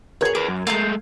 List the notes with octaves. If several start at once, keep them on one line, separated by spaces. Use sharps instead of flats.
G#4 A#4 C#5 G#6
G#4 B4 D6
F#2
G#3 A3 F5 A#5 G6